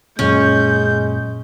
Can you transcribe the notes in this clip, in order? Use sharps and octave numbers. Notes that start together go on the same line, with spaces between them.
F#2 A#2 G#3 C#4 G6